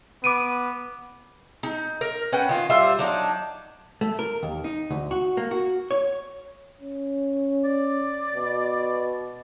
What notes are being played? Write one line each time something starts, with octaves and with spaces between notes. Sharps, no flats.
B3 D6 D7 D#7
D#4
A#4
C#4 B4 F#5 G5
D#3 F4
G3 F4 C5 E5
F#3 D4 D#4
A3
A#4
D#2
D#4
D2
F#4
A#3
F#4
C#5
C#4
D5
B2